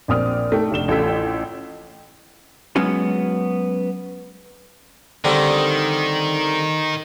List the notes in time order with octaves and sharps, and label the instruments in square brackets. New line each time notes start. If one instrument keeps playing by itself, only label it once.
[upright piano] A#1 A#2 C4 D5 D#6 F6
A3 D#4 G5
F1 D4 E7 G7
A1 F4 A4 G5 E6 B6
[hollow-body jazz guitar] F#3 G#3 B3 C#4 F#4
[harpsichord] D3 G3 C4 [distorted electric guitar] D#3